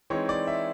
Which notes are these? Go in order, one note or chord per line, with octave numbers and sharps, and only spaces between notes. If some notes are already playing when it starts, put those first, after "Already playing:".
E3 G#3 C4 D#4 C#5
D5
E5